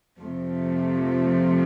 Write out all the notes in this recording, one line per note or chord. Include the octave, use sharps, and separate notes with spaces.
F2 C3 F3 A3